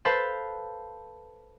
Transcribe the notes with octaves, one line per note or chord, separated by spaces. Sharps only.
A4 B4 C5 F5 A5